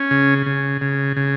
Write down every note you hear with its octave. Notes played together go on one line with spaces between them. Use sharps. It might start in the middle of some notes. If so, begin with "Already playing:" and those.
Already playing: C#4
C#3
C#3
C#3
C#3